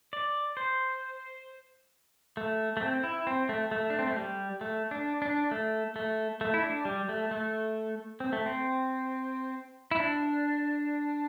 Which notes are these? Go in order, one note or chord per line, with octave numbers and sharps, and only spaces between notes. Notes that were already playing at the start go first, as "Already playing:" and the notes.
D5
C5
A3
A3
C4
E4
C4
A3
A3
D4
C4
A3
G3
A3
D4
D4
A3
A3
A3
E4
D4
G3
A3
A3
C4
A3
C4
E4
D4